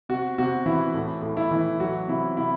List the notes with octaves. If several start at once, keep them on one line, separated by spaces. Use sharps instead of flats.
C3 F#4
C3 F#4
E3 E4
A2
A2
E4
E3
F#3 F#4
C3 E4
C3 E4